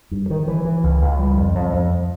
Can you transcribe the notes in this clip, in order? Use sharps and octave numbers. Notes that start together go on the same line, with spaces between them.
G2
D#3
E3
E3
C#2
C#2
G3
F2
F2
F2